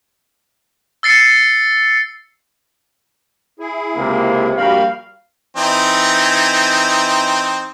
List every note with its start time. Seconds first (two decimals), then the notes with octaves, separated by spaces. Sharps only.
1.03 E6 A6 C7 C#7
3.59 E4 G#4
3.96 C#2 C3 A#3
4.57 A#1 A#2 G3 F#4 A#4 F5 B5
5.57 E3 C4 D#4